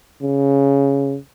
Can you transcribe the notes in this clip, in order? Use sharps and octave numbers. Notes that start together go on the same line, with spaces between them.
C#3